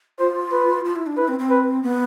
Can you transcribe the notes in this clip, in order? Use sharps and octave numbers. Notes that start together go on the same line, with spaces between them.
F4 C5
B4
F4
E4
D4
E4 B4
C4
C4
B4
B3